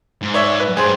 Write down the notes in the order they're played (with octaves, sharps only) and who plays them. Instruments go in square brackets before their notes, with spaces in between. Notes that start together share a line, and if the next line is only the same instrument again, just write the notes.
[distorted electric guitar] G#2
[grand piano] C#5 D5 E5
B4
[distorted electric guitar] G2 [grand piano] G#4 C5